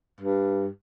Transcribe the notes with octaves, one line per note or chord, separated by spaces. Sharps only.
G2